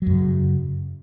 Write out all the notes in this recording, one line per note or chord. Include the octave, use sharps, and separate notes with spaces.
F#2 C#3 F#3